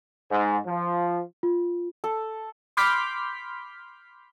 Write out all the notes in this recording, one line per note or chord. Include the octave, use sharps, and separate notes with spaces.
G#2
F3
F4
A4
B5 C6 D6 F6 G6 B6